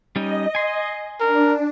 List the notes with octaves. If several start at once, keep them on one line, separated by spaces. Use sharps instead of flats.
G3 C#4 D#4 D#5
G#5 C6
D4 A#4